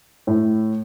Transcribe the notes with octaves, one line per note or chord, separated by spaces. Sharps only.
A2